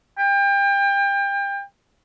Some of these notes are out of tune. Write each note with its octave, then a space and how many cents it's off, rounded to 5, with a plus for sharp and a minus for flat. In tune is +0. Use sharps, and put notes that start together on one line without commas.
G5 +30